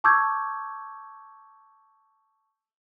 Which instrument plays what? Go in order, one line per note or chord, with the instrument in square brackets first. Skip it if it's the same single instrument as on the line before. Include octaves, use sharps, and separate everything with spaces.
[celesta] A5 C#6 D6 E6 G6 G#6